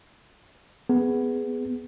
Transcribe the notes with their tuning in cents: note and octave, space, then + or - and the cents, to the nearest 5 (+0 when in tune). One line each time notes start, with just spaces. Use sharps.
B3 +10 G#4 +0